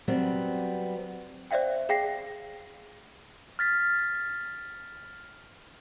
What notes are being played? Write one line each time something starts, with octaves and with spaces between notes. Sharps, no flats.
F#3 G3 B3 C4
C5 D5 E5 F5 G5
G#4 F5 G5 A#6 C7
F6 A6 B6